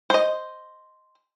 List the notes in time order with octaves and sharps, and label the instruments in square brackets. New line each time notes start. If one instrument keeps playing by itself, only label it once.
[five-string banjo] C5 D#5